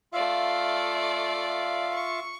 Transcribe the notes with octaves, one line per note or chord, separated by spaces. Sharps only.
A3 F4 D5 E5 F5
C#6